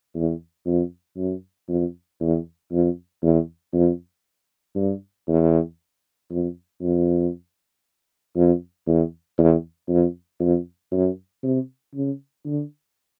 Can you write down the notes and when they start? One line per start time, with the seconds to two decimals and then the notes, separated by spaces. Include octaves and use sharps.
0.15 E2
0.66 F2
1.17 F#2
1.69 F2
2.20 E2
2.72 F2
3.22 E2
3.73 F2
4.76 G2
5.28 E2
6.31 F2
6.81 F2
8.36 F2
8.87 E2
9.38 E2
9.89 F2
10.40 F2
10.92 F#2
11.43 C3
11.95 C#3
12.46 D3